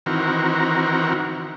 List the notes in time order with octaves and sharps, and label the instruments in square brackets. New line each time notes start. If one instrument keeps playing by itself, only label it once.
[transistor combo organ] D#3 E3 C4 F#4 A#4